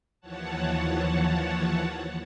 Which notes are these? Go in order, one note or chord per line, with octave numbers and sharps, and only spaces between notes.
D#2 E3 F3 C#5 F#5 A5